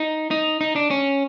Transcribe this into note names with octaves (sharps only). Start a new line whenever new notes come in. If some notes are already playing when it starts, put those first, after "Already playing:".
Already playing: D#4
D#4
D#4
D4
C#4